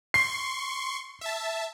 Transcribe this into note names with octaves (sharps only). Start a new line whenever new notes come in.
C6 C#6 C7
E5 A5